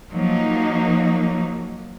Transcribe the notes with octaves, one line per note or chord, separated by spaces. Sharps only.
F3 F#3 A#3 D#4